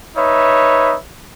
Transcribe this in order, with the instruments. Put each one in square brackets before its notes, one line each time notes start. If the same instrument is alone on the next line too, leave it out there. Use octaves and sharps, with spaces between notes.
[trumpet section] D#4 B4 C#5 E5